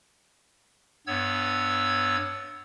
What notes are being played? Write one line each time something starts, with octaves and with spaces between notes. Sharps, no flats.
G2 B3 C#5 E6 G#6